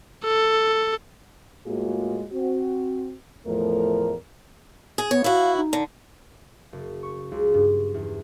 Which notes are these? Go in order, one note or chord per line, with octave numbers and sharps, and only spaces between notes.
A4
A2 G#3 A#3 F4 F#4 G#4
C4 F#4
E2 A2 F3 A3 A#4
G#4
B3 C#5
E4 F#4 F5
D#4
D3
F#1
C#6
C#2
G2
E2